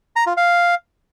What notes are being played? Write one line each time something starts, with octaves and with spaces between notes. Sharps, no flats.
A#5
F4
F5